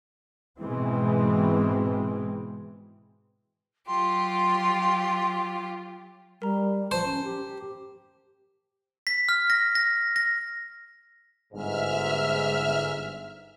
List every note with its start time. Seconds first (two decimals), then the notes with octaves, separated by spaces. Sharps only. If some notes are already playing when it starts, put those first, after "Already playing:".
0.59 G#2 B2 E3 G#3 C4
3.87 F#3 F4 G4 C6
6.42 G3 A#4 A#5
6.91 F3 C5 A5
7.04 C#4
7.24 G4
9.07 B6
9.29 F6
9.50 A#6
9.75 A#6
10.16 A#6
11.53 G1 G#2 E5 F6